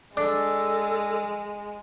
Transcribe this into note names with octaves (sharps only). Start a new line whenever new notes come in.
G#3 D4 A4